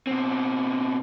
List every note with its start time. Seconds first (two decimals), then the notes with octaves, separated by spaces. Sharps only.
0.07 B2 C4